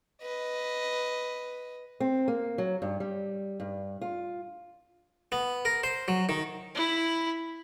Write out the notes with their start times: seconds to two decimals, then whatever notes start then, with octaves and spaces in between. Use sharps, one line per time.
0.22 B4 D#5
2.00 C4
2.28 A#3
2.58 F#3
2.82 G2
3.00 G3
3.60 G2
4.01 F4
5.32 B3
5.65 A#4
5.83 C5
6.08 F#3
6.29 D#3
6.75 E4 B5